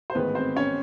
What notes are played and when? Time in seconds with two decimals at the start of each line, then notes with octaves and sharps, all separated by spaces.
0.10 C5
0.15 A1 G#2 D#3 G#3 B3 B4
0.35 C4 C5
0.56 C#4 C#5